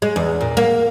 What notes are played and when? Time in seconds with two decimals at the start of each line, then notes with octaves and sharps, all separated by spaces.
0.02 G#3
0.16 E2
0.41 A#2
0.57 A#3